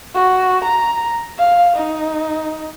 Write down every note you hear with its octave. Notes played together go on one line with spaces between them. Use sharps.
F#4
A#5
F5
D#4